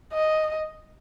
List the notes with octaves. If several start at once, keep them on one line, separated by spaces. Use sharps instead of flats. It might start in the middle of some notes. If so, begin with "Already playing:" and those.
D#5